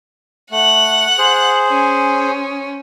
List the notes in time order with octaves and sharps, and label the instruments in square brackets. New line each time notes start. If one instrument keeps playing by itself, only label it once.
[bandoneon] A3 [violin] F#5 F#6
[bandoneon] G#4 C5
[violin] C#4